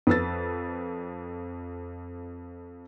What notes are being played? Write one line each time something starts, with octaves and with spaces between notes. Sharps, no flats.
F2 B4 E6 A6